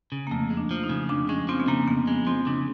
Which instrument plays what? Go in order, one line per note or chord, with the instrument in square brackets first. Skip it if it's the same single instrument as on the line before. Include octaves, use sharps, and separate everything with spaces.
[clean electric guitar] C#3
[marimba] A#3
[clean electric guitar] F2 [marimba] A3
[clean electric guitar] G#3
[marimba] D4
[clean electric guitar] F3
[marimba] D#4
[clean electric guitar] C#3
[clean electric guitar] F2 [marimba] D4
[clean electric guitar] G#3 [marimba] C#4
[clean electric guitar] F3 [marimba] C4
[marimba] B3
[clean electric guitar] C#3 [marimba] A#3
[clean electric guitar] F2 [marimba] B3
[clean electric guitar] G#3 [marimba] B3
[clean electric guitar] F3 [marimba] C4
[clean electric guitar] C#3 [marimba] D4